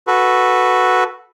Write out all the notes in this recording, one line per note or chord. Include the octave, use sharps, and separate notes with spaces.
F#4 A4 B4